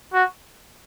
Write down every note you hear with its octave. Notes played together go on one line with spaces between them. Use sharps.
F#4